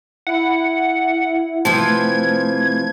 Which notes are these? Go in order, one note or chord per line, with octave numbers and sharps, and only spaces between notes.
E4 F#5
C3 E3 F3 A3 C5 G#6